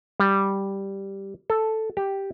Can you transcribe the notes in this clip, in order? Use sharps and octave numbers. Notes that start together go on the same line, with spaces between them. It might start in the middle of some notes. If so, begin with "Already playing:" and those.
G3
A4
G4